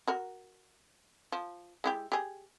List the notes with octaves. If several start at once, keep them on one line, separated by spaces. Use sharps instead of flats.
F#4 A#4
F3
G#3 E4 G4
G4 G#4